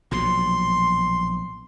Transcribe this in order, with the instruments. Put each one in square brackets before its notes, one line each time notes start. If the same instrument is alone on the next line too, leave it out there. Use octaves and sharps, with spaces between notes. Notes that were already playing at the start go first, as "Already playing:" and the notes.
[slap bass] A#1 B2 F#3 [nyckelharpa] C6